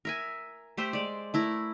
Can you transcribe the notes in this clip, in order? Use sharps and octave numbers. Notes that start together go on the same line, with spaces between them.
A#4 E5 G#5
A3 G4 C5 E5
G#3 D5
A3 E4 A#4